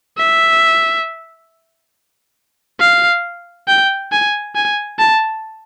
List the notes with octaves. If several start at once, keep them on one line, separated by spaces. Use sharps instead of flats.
E5
F5
G5
G#5
G#5
A5